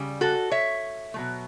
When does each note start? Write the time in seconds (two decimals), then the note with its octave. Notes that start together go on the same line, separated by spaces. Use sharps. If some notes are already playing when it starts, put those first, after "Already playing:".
Already playing: C#3 G3
0.21 F#4 A4
0.51 C#5 E5
1.14 B2 F#3 A3